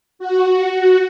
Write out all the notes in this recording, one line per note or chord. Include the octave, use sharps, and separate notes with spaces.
F#4